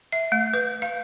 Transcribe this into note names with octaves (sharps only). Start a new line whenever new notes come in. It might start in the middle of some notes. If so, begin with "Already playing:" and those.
E5
A3
B4
F5